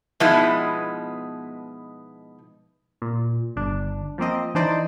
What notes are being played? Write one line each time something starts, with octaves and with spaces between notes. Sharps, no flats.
B2 F3 G#3 B3 D#4 E4
A#2
G1 D4
F3 A#3 C4 D#5
E3 D4 D#4 C5 D5 D#5